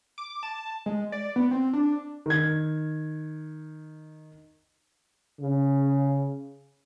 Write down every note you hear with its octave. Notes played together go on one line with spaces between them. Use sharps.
D6
A5
G#3
D5
B3
C4
D4
D#3 G#6
C#3